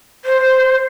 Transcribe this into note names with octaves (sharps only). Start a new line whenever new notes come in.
C5